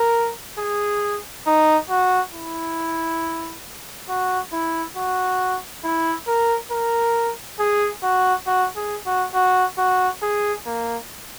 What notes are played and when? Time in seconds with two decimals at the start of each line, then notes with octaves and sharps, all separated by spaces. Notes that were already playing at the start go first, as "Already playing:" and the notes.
Already playing: A#4
0.59 G#4
1.47 D#4
1.90 F#4
2.34 E4
4.09 F#4
4.53 E4
4.97 F#4
5.84 E4
6.28 A#4
6.71 A#4
7.59 G#4
8.03 F#4
8.47 F#4
8.76 G#4
9.06 F#4
9.34 F#4
9.78 F#4
10.22 G#4
10.66 A#3